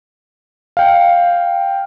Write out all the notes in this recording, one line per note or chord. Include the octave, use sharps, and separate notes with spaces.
F5 G5